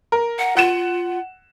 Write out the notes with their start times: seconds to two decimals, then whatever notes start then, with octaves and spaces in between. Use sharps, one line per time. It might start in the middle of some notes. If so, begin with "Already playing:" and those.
0.12 A#4
0.39 F#5
0.57 F4 F#5 E7